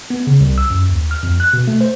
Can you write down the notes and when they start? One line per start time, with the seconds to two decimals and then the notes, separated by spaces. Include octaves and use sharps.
0.10 B3
0.27 C#3
0.40 C2
0.58 E6
0.70 F#2
0.89 D#2
1.11 F6
1.23 F2
1.40 F#6
1.53 B2
1.67 A3
1.81 C5